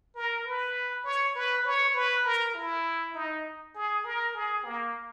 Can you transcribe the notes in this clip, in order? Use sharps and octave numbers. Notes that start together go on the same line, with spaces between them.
A#4
B4
C#5
B4
C#5
B4
A#4
E4
D#4
G#4
A#4
G#4
A#3